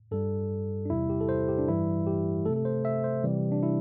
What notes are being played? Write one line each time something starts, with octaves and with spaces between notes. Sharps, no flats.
G2 G3 A4
D4
E2 C3 G3 E4
G4
A4
C5
G4
D4
G2 E3 G3 E4
G4
C3 A3 A4
A4
C5
E5
C5
C3 E3 G3
D4
E4